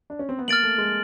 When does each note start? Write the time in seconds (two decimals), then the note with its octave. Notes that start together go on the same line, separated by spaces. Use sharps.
0.10 D4
0.19 C#4
0.29 C4
0.39 B3
0.48 A#3 F6 A6 D7 F#7
0.63 A3
0.78 G#3